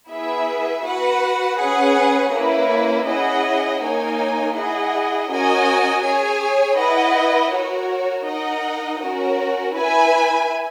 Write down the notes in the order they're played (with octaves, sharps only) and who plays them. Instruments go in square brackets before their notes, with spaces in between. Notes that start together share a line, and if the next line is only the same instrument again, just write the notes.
[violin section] B3 E4 G#4 B4 E5
F#4 B4 F#5
C#4 G#4 B4 F#5
A#3 C#4 E4 B4
C#4 E4 G#4 D#5 F#5
A#3 D#4 A#4 C#5 G#5
E4 G#4 D#5 F#5
C#4 F#4 A#4 D#5 G#5
G#4 C#5 G#5
E4 B4 D#5 F#5
F#4 A#4 C#5
D#4 A#4 D#5 F#5
C#4 F#4 A#4
E4 B4 E5 G#5